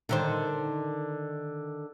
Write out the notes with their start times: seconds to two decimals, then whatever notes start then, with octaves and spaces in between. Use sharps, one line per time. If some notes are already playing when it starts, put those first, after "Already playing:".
0.09 D3 D#3 C5